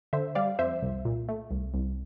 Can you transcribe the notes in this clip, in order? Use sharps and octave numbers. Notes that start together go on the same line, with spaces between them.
D3 C5 E5
G3 D5 F5
F2 C5 E5
C2
A#2
A3
C2
C2